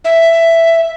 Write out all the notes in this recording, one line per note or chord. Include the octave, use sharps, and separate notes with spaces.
E5